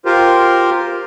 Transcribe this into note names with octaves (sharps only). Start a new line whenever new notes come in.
F4 G4 A#4 C5